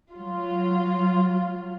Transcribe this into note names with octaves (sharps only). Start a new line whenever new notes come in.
F#3 F4